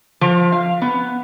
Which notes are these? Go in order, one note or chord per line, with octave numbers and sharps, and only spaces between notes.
F3
F5
B3